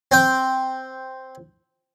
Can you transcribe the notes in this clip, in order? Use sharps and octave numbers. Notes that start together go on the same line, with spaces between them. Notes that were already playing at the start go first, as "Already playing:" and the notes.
C4 G5